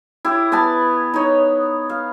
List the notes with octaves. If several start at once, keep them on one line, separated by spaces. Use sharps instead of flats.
E4 G4
B3 B4 G#5 A5
D#4 C#5
F5